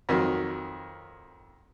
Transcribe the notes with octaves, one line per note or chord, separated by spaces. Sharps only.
F2 D#3 F#3